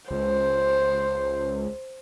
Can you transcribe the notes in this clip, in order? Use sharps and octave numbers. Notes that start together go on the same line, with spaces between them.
C#2 C5